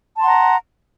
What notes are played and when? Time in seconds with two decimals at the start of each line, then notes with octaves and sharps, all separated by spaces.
0.16 A5
0.20 C6
0.23 F#5
0.27 A#5